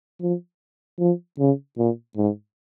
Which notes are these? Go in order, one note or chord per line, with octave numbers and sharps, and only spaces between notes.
F3
F3
C#3
A#2
G#2